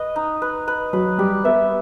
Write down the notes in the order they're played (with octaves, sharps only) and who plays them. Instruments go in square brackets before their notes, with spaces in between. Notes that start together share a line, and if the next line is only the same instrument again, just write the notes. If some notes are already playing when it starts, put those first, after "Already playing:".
Already playing: [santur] B4 D#5
D#4
B4
B4
[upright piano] F#3 [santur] B4
[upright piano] G3 [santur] G4
[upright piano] B3 [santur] E5